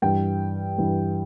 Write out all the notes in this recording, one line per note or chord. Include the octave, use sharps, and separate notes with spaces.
G2 E3 G5
G2 E3